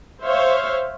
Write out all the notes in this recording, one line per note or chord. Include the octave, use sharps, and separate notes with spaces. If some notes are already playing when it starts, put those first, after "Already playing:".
C5 C#5 E5 F5